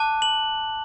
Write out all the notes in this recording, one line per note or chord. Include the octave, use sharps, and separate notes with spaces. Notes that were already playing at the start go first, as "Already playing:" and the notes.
Already playing: A5 D6 F#6
F#7